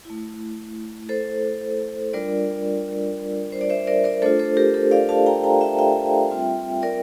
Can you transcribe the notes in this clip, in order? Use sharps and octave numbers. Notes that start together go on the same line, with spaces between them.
A3 E4
A4 C5
G3 D4 F4 A#4 D5
C5
D5
C5 E5
A#4 D5
A#4 D5
A3 D4 F4 A4 C5
A4 C5
G4 A#4
A4
D5 F5
F5 A5
G5 A#5
G5 A#5
E5 G5
E5 G5
G3 C4 F4
A#4 D5